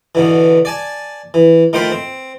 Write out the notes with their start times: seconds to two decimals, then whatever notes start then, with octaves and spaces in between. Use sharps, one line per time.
0.15 B2 D3 E3
0.65 D5 G#5 A5
1.34 E3
1.73 D#3 A3 F4 C5 G5 B5
1.92 C4